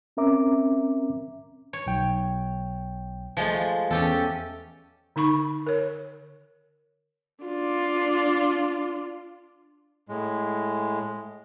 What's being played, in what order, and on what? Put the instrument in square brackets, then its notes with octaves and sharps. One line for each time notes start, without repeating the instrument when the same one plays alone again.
[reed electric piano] C4 C#4 A#4 E5 A#5 D6
[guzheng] C#5
[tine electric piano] B1 G5
[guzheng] F3 G#3 A3
[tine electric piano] E2 [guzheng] C#4 G4 A4
[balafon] D3 D#4 B5 C#6
A#4 C#5
[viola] D4 F4
[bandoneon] A2 G#3